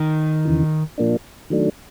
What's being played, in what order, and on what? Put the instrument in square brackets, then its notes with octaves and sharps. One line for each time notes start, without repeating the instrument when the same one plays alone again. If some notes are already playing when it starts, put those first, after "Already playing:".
Already playing: [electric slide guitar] D#3
[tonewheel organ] E2 C#3 E3
A#2 F3 A#3 D4
D#3 F#3 A3 D4